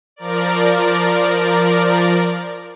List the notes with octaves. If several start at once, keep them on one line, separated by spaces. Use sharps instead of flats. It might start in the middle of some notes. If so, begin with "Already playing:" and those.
F3 A#4 D5